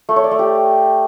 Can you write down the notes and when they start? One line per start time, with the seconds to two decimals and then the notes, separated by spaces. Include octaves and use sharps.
0.09 A3
0.16 C#5
0.24 D5
0.31 A3
0.39 G4